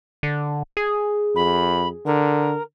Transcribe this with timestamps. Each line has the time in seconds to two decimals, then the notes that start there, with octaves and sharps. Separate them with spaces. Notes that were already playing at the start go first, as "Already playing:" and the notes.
0.23 D3
0.77 G#4
1.35 F2 B5
2.06 D3 A#4